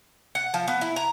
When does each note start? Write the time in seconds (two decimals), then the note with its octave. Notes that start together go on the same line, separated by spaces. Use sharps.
0.35 F#5
0.54 F3
0.68 B3
0.81 E4
0.96 A#5